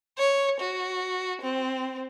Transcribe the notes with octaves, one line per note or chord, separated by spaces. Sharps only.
C#5
F#4
C4